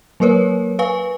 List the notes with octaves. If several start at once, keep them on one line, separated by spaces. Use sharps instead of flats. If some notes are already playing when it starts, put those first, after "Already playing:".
F#3 A#3 A#4 B4 C#5
B4 F5 G#5 C#6